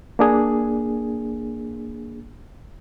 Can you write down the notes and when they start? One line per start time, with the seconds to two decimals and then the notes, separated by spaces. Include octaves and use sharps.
0.19 A#3 D4 G#4